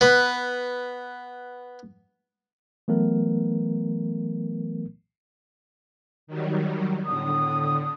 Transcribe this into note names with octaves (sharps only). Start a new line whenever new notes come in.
B3 B4
E3 F#3 A3 B3 A#4
D#3 F#3 G3
A2 D3 B3 D#6